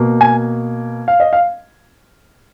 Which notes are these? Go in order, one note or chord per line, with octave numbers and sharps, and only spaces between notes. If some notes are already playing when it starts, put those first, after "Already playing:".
Already playing: B2 A#3
G#5
F5
D#5
F5